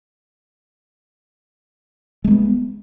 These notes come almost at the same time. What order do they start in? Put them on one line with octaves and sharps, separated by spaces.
G#3 A3 B3